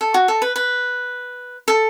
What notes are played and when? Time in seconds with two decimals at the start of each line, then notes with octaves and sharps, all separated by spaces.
0.01 A4
0.14 F#4
0.28 A4
0.42 B4
0.56 B4
1.68 A4